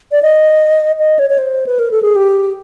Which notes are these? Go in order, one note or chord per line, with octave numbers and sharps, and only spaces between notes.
D5
D#5
D#5
C#5
C#5
C5
B4
A#4
A4
G#4
G4